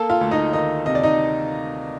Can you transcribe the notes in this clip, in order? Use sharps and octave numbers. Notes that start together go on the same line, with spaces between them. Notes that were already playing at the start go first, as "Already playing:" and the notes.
Already playing: A#3 A4 A5
F4 F5
D2
D#4 D#5
D#3 D#4 D#5
C3 D#5
D5
D#4 D#5